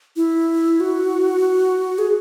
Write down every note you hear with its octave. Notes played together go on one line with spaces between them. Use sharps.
E4
F#4
G#4